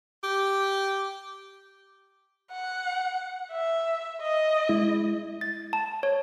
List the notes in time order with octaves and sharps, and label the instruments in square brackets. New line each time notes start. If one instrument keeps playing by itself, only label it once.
[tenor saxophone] G4
[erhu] F#5
E5
D#5
[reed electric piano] G#3 E4
[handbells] A6
A5
C#5